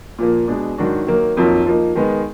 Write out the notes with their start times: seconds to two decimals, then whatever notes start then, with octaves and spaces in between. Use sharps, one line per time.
0.18 A#2 F3 A#3
0.48 B2 G#3 D4
0.78 G#2 D#3 F#3 D4 F#4
1.07 D#3 F#3 A#3
1.37 F2 D#3 F#3 A#3 F4
1.66 F3 A#3 D#4
1.96 D#3 G#3 B3